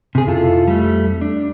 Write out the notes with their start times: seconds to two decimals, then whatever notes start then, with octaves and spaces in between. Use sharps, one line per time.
0.15 C3 G#4
0.27 F2 E4 F4 A4
0.68 G3 A3
1.21 D4